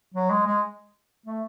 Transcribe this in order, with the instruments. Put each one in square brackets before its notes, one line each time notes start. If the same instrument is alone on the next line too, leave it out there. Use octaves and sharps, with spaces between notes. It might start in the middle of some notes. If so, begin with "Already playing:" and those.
[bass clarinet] F#3
G#3
G#3
A3